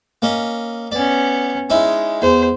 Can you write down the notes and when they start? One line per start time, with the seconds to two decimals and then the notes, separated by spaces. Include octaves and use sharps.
0.22 A#3 C#4 D#5
0.92 B3 C#4 D5
1.70 G#3 C#4 D#4 E4
2.22 E2 C5